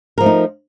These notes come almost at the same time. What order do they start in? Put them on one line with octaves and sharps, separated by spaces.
A#4 F3 A3 D#4